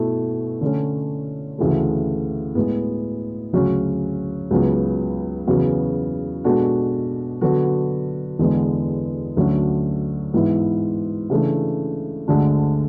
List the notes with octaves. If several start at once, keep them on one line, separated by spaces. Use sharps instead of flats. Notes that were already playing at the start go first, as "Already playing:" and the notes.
Already playing: B2 A3 E4 A4
D3 A3 C#4
D2 C#3 E3 A3
A2 G#3 B3
D2 C#3 F#3 C#4
C#2 C#3 F#3 B3
E2 C#3 F#3 B3 F#4
B2 G#3 D4 F#4 A4
D3 F#3 B3 F#4 A4
E2 D3 G#3 B3
D2 D3 F#3 C#4
G#2 E3 B3 E4
C#3 E3 A3 D4
D2 D3 G#3 D4